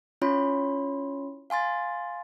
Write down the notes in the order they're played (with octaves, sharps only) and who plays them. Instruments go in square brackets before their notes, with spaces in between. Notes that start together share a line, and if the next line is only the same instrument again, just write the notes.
[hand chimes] C#4 E4 F4 C#5 B5 C6
F5 G#5 C6 A6